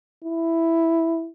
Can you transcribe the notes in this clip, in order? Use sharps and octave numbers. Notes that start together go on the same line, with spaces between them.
E4